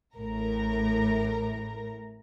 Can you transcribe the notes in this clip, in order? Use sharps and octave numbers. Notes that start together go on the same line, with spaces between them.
A1 A2 A#4 A#5